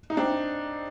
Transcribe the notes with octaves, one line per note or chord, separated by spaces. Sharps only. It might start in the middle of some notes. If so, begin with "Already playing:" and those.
D#4
C4 D4